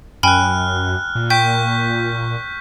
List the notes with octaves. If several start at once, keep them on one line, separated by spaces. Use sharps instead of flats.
F#2 G5 G#5 B5 F6 F#6
A#2
G5 C#6 G6 B6